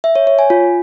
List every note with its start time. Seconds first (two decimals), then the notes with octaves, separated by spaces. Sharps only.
0.04 E5
0.16 C#5
0.27 C#5
0.39 G#5
0.50 F4